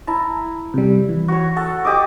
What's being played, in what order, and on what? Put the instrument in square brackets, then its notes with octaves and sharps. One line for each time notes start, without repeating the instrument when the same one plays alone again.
[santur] E4 [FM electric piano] A5 A#5
[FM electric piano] C3 G3
E3
[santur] F#4 C#5
[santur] A4 [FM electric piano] F#5
[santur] G4 D#5 D6